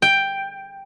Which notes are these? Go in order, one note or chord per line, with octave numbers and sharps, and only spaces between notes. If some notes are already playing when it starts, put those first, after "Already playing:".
G5